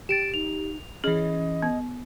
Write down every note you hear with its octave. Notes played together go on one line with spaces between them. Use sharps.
G4 A6 D7 E7
D#4 F7
E3 C#4 G#4 D#5
B3